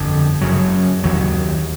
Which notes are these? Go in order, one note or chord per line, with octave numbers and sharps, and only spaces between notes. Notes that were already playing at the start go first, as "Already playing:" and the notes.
Already playing: G1 F2 D3
F#2 C#3 F#3
D#2 D#3 F#3